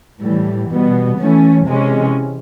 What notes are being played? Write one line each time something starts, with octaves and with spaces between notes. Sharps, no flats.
A2 E3 G3
B2 G3 B3
E3 A3 C#4
C3 E3 G#3 C#4